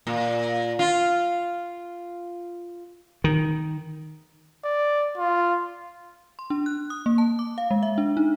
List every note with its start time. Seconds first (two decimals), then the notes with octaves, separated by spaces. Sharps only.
0.07 A#2
0.79 F4
3.24 D#3
4.65 D5
5.18 F4
6.39 C6
6.50 D4
6.66 F#6
6.90 D#6
7.06 A#3
7.18 A5
7.39 D6
7.58 F5
7.71 G#3
7.83 E5
7.98 D4
8.17 D#4